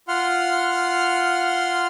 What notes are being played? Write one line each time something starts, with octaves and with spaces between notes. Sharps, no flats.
F4 F#5 C6 F6